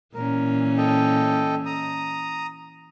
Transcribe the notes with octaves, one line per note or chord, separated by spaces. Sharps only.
A#2 E3 C#4 A#4
A4 D#5 G5
A#5 D#6